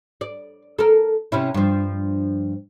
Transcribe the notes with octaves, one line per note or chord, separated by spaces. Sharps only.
D5
A4 A#4
C3 C#4 E4
G2 F3